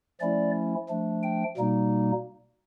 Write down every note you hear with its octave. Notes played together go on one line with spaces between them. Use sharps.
F3 A3 C#4 E4 D5
F3 A3 D4
G5
B2 G3 A#3 D#4